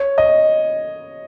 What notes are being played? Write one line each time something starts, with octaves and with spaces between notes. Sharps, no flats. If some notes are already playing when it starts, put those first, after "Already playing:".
Already playing: C#5
D#5